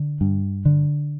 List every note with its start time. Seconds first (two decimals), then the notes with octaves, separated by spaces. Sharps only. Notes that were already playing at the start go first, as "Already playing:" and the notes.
Already playing: D3
0.21 G2
0.65 D3